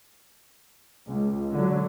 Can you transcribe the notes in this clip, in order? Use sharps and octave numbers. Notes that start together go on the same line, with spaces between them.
C#2
D3 F#3